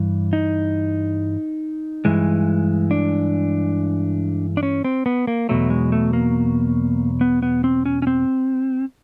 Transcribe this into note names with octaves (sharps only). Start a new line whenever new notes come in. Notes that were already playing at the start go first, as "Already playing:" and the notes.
Already playing: G2 E3 G3
D#4
G2 E3 G#3
D4
D4
C#4
C4
B3
A#3
E2 B2 F#3 A3
G#3
A3
A#3
B3
B3
C4
C#4
C#4
C4